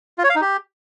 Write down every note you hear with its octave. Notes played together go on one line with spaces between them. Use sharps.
F4
C#5
F5
D#4
G4